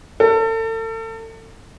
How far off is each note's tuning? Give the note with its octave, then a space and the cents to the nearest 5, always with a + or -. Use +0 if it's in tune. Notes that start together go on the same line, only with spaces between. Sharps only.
A4 +35